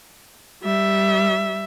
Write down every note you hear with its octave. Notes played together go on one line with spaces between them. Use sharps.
G3 E5